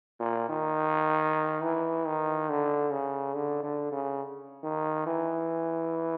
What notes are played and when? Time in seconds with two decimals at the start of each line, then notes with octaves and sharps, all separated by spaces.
0.20 A#2
0.49 D#3
1.63 E3
2.06 D#3
2.50 D3
2.92 C#3
3.34 D3
3.63 D3
3.92 C#3
4.64 D#3
5.07 E3